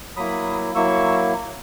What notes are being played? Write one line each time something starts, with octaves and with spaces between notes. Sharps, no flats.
F#3 A#3 E4 B5 D#6
F#3 A#3 E4 C#6 E6